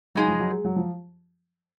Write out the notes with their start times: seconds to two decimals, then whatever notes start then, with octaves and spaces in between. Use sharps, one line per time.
0.15 C#3 F#3 G#3 D#4 G#4
0.28 F3
0.39 F#3
0.52 G#3
0.65 F#3
0.76 F3